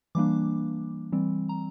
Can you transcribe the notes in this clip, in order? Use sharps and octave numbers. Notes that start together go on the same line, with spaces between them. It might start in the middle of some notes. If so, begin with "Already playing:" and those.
E3 G3 A#3 D4 D6
E3 G3 C4
A#5